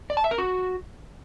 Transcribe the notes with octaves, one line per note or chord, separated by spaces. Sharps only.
D5
A5
E5
A#4
F#4